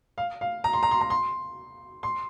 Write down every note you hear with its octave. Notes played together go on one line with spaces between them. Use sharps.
F5
F5
A#5
C6
A#5
C6
A#5
C6
C6